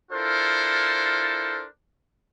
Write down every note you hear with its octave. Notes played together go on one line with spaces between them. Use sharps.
D4 E4 F4 A4 A#4 C5